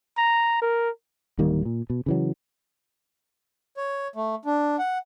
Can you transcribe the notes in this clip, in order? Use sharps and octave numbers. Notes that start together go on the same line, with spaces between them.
A#5
A#4
D1 D#3 G3 A#3
A#2
B2
C#3 E3 F#3
C#5
A3
D4
F#5